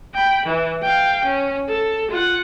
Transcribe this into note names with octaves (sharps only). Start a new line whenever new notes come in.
G5 B5
E3
F5 G5
C#4
A4
F4 F#5